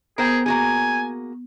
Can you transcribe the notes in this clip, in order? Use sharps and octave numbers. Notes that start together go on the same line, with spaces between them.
B3 G#4 A#4 C5 G5
A#3 F#4 G#4 G#5